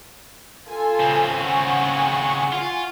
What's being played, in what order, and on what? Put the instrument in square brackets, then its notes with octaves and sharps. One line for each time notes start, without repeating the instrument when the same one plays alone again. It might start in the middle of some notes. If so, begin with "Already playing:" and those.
[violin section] F4 A4 G#5
[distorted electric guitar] C#3 C4
[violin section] F#5 G#5 C#6
[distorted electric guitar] F4